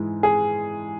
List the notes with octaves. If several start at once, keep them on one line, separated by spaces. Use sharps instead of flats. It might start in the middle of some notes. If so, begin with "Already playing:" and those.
Already playing: G#2 E3 G#3
G#4